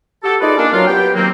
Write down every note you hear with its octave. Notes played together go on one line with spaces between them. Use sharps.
F#4 G4 A4
A3 D#4 F4 G#4 B4 D5
A#3 C#4 D4
F#3 F4
B3 G4 G5
D#3 F#3 A#3 C4